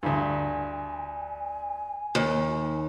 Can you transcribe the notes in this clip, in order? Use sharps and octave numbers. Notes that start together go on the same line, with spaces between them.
D2 G2 G#5
D#2